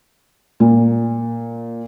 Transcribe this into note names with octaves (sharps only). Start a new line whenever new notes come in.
A#2